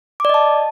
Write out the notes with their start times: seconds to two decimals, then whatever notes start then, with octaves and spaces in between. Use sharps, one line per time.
0.20 D6
0.25 D5
0.29 D#5
0.34 A5